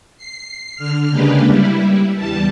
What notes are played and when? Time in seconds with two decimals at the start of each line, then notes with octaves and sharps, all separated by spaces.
0.18 C7
0.76 D3 F6
1.10 C#3 G#3 A#3 D4 G4 B4
1.47 G3 E4
2.17 E2 G3 A5